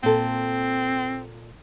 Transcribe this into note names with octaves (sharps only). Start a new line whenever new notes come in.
A#2 C4 A4